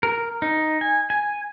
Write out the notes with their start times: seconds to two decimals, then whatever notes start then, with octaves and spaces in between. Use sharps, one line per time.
0.03 A#4
0.42 D#4
0.81 G#5
1.10 G#5